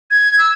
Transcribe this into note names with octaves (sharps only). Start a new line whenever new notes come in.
G#6
E6